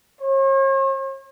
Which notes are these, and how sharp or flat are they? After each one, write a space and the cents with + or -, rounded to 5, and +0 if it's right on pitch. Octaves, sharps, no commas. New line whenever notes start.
C#5 -45